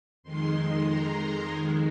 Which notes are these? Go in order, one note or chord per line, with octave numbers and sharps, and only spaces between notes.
F2 D#3 G#3 C6
A#5
F2 D#3 G#3 G#5